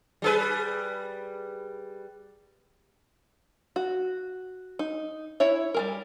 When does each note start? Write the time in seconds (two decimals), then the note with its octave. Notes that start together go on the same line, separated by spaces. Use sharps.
0.22 G3 G#4 B4
3.76 F#4
4.79 D#4
5.40 E4 C#5 E5
5.74 G3 G#4 A#4